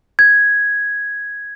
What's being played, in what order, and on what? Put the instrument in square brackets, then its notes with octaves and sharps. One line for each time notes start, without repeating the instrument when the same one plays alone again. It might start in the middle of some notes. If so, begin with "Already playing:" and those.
[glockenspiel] G#6